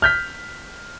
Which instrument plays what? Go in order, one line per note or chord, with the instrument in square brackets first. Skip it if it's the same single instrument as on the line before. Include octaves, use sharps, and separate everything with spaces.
[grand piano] F6 G6 B6